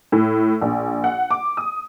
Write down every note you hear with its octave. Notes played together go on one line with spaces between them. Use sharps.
A2
A#1
F#5
D6
D#6